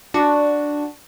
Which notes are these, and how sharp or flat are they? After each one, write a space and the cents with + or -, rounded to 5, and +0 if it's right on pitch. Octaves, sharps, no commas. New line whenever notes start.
D4 +0 F#4 +0